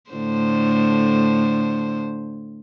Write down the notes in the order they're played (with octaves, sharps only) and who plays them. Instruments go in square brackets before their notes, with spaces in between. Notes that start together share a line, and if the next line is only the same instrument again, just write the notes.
[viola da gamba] A2 D3 C5